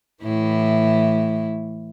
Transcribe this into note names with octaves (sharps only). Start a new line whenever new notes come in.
A2 E3 E4